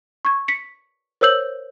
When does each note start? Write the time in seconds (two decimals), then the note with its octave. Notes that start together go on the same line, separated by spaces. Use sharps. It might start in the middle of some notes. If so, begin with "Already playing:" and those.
0.25 C#6 G#6
0.48 B6 C#7
1.21 A#4 C5 C#5 E6 G6 F#7